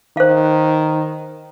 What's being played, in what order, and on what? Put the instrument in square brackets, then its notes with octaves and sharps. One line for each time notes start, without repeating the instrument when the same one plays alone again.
[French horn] D#3 [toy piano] C5 F5